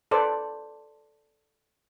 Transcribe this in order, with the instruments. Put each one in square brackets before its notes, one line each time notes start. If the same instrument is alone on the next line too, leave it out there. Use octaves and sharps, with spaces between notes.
[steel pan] A4 B4 C5 D5